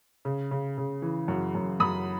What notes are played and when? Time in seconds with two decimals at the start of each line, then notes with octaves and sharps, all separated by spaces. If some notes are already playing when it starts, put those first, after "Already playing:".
0.25 C#3
0.51 C#3
0.78 C#3
1.02 E3
1.28 F#2
1.55 F#2
1.80 F#2 B5 D#6